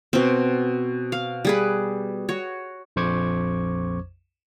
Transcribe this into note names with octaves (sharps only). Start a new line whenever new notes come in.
B2 C4
F5
G3 G#4 B4
F#4 C#5
A#1 F2 C5 C#6 D6 G#6